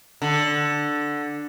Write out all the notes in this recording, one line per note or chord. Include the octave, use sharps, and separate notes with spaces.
D3